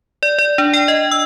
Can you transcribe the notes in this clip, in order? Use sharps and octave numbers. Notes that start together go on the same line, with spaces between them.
D5
D5
D4
G5
D#5
E6